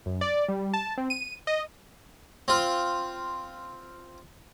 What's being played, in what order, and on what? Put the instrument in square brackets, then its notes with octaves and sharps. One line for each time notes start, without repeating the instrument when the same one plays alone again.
[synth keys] F#2
D5
G3
A5
C4
D#7
D#5
[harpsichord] C4 F4